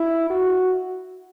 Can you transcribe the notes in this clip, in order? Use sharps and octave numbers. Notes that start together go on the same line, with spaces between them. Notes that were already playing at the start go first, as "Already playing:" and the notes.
Already playing: E4
F#4